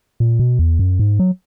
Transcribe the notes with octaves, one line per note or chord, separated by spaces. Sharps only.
A#2
B2
E2
F#2
G#2
F#3